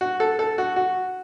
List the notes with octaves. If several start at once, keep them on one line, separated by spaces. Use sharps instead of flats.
F#4
A4
A4
F#4
F#4